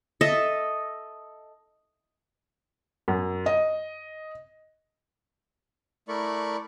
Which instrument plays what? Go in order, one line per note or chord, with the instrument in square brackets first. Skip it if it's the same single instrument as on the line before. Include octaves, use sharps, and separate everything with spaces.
[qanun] A4 D#5 E5
[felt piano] F#2
D#5
[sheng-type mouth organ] A3 E4 A#4 D5 B5 C#6